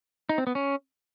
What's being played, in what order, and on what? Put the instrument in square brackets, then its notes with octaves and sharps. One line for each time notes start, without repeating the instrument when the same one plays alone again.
[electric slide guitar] D#4
C4
B3
C#4